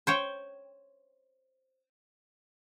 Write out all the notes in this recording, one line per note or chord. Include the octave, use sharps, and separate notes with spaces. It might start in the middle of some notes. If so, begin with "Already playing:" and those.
C5 C#5 G5